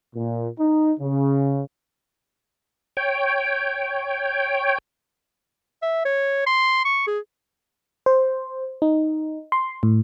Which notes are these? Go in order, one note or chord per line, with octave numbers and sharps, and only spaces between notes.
A#2
D#4
C#3
C#5 G5
E5
C#5
C6
C#6
G#4
C5
D#4
C6
A2